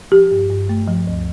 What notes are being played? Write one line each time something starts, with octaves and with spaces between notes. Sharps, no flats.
F3 G4
G2
G2
A3
F3
D2